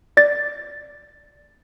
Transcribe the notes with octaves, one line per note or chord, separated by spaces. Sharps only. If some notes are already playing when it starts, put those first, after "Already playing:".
D5 A6